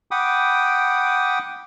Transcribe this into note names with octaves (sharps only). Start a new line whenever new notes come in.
F#5 G5 B5 D6 D#6